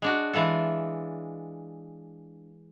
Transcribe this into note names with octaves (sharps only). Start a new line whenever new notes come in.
G#3 D4 F#4
E3 G#3 F4 A4